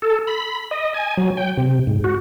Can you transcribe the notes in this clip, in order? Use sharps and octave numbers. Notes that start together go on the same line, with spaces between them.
A4
B5
D#5
G#5
F#3
G5
C3
G#2
F#4